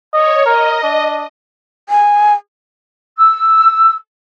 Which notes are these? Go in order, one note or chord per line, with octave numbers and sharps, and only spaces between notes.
C#5 D#5
A#4 D#5
D4
G#5
E6